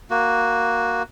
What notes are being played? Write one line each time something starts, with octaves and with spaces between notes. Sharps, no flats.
A#3 F#4